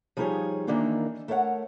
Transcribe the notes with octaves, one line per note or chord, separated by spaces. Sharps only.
F3 G3 D#4 F4 G#4 C#5
D#3 E3 A#3 D4 D#4 F4
A3 A#4 C#5 F5 F#5